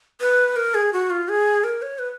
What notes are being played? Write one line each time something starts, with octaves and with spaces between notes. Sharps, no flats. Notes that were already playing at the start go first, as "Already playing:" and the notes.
B4
A#4
G#4
F#4
F4
G#4
A#4
C#5
B4